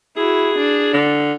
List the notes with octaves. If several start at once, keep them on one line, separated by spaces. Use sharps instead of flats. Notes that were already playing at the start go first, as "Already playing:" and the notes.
E4 F#4 G#4
D4
D3